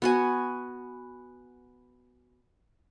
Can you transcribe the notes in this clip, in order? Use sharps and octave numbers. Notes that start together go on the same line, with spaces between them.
B3 F#4 G#5